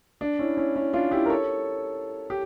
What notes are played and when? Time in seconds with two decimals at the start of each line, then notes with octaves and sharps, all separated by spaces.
0.21 D4
0.39 C#4 E4
0.57 C#4 E4
0.76 C#4 E4
0.93 D4 F4
1.11 E4 G4
1.26 A#4
1.30 A4 C#5
2.30 G4